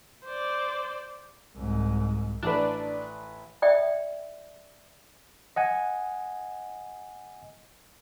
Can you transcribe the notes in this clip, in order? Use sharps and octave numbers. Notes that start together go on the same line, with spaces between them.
C5 D5
C2 G#2
A1 D4 B4
D5 E5 G5
D#5 F#5 G#5